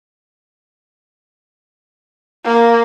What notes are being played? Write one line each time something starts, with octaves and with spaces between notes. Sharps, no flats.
A#3